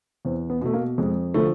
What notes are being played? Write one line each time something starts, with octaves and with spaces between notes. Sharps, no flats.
E2 C4
B3
B2 A3
A#3
F2 G#3
D3 F3 A3